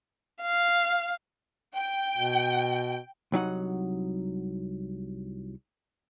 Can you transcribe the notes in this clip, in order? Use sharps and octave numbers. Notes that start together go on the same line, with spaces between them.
F5
G5
B2
C2 F#3 D#4 F#5